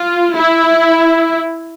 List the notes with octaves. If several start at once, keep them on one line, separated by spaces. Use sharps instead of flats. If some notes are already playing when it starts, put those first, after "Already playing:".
Already playing: F4
E4